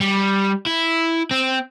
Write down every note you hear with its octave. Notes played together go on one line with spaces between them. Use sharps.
G3
E4
C4